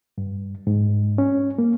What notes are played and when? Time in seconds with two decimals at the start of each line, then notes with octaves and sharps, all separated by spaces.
0.18 G2
0.67 G#2
1.18 C#4
1.58 A#3